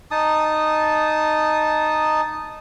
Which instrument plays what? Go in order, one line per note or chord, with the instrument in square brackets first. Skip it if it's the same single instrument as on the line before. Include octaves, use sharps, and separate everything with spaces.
[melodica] D#4 A5 D#6